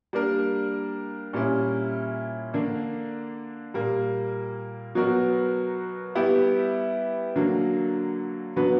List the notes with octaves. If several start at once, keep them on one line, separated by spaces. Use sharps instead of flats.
G3 A#3 D4 A#4
A#2 G3 C#4 E4
D3 A#3 D4
A#2 G3 A#3
B2 F#3 B3 F#4 A#4
G3 B3 E4 G4
D3 F#3 A#3
D3 F#3 B3 F#4 B4